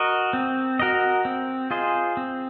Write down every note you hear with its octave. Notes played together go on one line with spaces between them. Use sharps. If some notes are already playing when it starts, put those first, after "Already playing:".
Already playing: F#4 A#4 D#5
C4
F#4 A#4 D#5
C4
F4 G#4 C5 D#5
C4